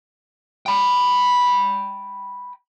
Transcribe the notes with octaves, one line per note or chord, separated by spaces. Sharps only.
G5 B5